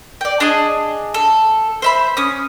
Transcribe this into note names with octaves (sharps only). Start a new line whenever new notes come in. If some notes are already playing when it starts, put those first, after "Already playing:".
D5 G5
D4 G#4 D#5
A4
C5 E5 B5
C#4 D#6